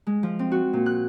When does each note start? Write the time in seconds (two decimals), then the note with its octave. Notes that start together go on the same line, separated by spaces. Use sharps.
0.07 G#3
0.23 F3
0.39 C4
0.51 F#4
0.73 A#2
0.86 F#6